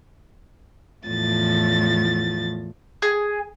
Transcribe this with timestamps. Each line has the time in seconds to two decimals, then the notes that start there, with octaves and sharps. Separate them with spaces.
1.06 E2 A2 F3 A6
3.02 G#4